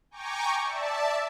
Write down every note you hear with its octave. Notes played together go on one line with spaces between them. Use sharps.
G5 G#5 A#5 C#6 D6
D5 E5 A5